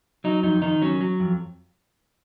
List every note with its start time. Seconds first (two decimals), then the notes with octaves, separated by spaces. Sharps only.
0.24 F#3 D#4
0.43 F2 D#4
0.62 D#3 D#4
0.82 F#3 C#4
1.01 F#3
1.20 F2